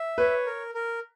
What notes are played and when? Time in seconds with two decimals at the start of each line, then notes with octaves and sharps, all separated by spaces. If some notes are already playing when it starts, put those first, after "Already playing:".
Already playing: E5
0.18 B4 C#5
0.46 A#4
0.75 A#4